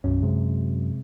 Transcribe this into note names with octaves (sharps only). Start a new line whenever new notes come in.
B1 F#2 C#4
C3 G#3